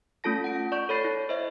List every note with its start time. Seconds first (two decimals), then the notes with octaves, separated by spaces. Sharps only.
0.24 A3 C#4 F4 A4 A5 A#6
0.44 F#5 D7
0.72 D5 C#6 G6
0.89 A4 C#5 B5 A6 C7
1.05 E4
1.29 C5 D#5 E5